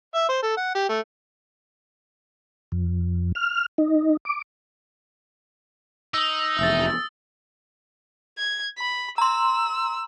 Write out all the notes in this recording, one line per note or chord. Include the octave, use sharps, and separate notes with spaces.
E5
C5
A4
F#5
G4
A3
F2
F6
D#4
D6
D#4 D#6 E6
F1 E2 E5 E6 A6
G#6
B5
A#5 C6 E6